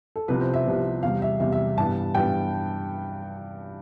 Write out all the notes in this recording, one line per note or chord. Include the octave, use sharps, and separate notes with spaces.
A4
C2 C3 F3 B3 B4
C5
E5
C2 C3 F3 B3
E2 C3 G3 F5
E5
E2 C3 G3 E5
E5
G2 E3 B3 A5
G2 E3 B3 G5